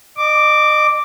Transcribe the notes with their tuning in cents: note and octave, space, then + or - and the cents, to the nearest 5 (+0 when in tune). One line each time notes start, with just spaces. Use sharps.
D#5 -30 D6 +0